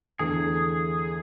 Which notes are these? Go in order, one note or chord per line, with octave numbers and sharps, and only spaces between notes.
E2 D3 A3 G#4